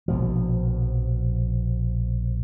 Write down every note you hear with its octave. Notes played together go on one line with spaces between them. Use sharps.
A#1 B2 F3